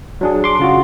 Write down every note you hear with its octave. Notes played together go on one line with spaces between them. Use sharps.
F#3 D4 G#4
C6 D6
C#3 F4 F#4